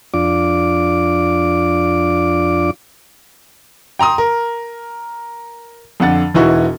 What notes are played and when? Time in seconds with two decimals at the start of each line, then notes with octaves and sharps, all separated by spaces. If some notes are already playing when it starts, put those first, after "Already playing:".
0.14 F2 D4 F4 D5 D6
3.99 G5 A#5 C6 D#6
4.18 A#4
6.00 F2 D3 F#5 A6
6.34 E1 E3 D#4 E4 F#4 C#6